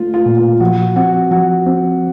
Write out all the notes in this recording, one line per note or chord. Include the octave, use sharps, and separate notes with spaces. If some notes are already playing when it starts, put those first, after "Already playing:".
Already playing: A3 F4
F4
A#2
F4
F3 F#4
C4 F#4
F3 F#4
C4